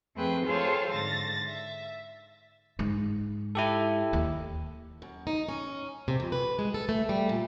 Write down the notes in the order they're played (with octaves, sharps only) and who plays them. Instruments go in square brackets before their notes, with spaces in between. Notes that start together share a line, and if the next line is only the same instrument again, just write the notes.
[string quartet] F2 A3 C4 G#4 B4 G5
F4 G#4 A4 C5 C#5 F5
G#2 D3 A6 A#6
E5
[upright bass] G#2
[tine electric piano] E4 G4 A4
[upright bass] D#2
[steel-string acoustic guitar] F#2
D#4
C#4
C3
F2
B4
G#3
A4
A3
G3
A#2